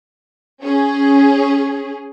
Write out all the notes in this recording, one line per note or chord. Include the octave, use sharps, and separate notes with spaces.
C#4 G#4